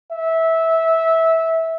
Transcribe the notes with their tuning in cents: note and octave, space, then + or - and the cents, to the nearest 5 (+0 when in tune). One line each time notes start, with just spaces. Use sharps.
E5 -15